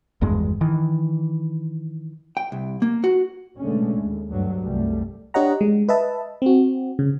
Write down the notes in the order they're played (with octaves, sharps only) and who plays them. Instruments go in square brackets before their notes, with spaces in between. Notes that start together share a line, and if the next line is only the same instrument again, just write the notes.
[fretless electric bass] G#1 E2 G2 G#3
D#3 E3
[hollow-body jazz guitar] G5
C2
A#3
F#4
[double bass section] B2 D3 G#3 A3 C#4
D#2
D2 G2 F#3
C2 F#2 G3 A3
[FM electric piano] D4 G4 C#5 D#5 F#5 A#5
G#3
B4 D#5 E5 A5
C4 F#4
C#3